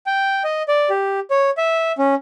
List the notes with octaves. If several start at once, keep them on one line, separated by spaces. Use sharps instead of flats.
G5
D#5
D5
G4
C#5
E5
C#4